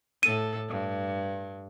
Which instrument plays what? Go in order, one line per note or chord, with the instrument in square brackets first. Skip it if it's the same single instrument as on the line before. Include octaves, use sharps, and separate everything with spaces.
[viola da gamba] A2 A4 [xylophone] D#7
[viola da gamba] G2